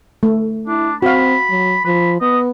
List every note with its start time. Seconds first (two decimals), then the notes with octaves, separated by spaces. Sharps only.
0.23 A3
0.67 D4 E4
1.02 C4 F#4 F5 B5
1.50 F#3
1.85 F3 B5
2.21 B3 D#5